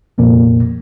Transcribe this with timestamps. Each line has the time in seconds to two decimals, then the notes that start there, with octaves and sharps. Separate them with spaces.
0.18 C2 F2 A#2 A#3